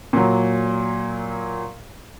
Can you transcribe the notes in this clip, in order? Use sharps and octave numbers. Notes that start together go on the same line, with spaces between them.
A#2 F#3